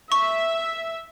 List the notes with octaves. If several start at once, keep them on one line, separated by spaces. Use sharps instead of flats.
E5 C#6